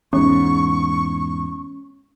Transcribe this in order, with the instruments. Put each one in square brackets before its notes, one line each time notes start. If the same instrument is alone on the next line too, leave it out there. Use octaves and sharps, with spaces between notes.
[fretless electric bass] E2 G#2 [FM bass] C#4 [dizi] C#6